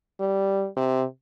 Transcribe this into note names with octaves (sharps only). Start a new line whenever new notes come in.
G3
C3